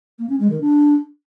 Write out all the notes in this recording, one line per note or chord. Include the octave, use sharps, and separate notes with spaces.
A#3
C#4
G#3
D#3
D4